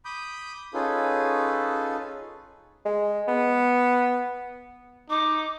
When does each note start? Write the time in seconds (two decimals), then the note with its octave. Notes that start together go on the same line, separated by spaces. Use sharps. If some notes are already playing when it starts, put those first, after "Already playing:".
0.05 B5 D6 D#6 G6
0.74 C#4 D#4 F4 G#4 A4 B4
2.85 G#3
3.28 B3
5.10 D#4 D6